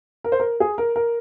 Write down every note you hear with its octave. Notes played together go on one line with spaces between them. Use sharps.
A#4
C5
A#4
G#4
A#4
A#4